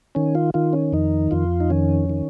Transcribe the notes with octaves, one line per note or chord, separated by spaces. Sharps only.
D#3 C#4
F4
D#3 F4
C#4
F2 D#4
F2 F4
D#4
D#3 C#4
D#3